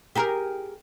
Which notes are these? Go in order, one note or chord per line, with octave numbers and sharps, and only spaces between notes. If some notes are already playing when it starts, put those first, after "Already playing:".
G4 G#4 A#4